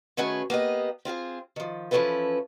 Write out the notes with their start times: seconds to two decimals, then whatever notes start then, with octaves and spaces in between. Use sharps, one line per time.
0.17 D#3 A3 C#4 F#4 G#4 B4
0.50 A#3 B3 G4 D#5
1.05 C4 F4 G4 G#4
1.56 D#3 F3
1.91 E3 F3 C#4 E4 A4 B4